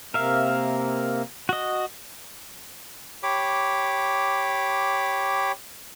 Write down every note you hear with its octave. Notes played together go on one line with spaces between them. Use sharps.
C3 A#3 A#4 E5 F5
F#4 D#5
G4 C#5 B5 D6